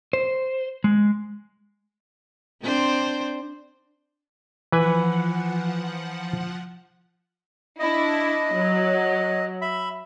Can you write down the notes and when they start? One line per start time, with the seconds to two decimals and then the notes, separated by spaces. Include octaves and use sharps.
0.13 C5
0.84 G#3
2.63 C4 D4 C5
4.72 E3 F3 B4 F#5 G#5
7.79 D4 E4 D#5
8.56 F#3
9.62 E5 B5